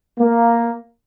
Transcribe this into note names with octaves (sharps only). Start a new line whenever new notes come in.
A#3